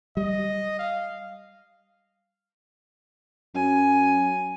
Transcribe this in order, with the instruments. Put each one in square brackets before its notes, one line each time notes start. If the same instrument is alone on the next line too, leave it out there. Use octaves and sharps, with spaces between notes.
[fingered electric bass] G3 [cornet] D#5
[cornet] F5
[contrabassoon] F#2 [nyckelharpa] G#5